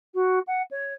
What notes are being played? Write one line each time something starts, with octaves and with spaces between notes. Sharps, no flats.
F#4
F#5
C#5